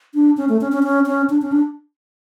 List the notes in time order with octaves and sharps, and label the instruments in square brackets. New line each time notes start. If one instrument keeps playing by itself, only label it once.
[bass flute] D4
C#4
A3
C#4
C#4
C#4
C#4
D4
C#4
D4